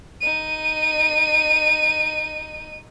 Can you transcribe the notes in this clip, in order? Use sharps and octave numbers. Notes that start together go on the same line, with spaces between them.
D#4 D#7